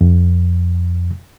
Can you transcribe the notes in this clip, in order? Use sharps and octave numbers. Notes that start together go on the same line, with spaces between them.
F2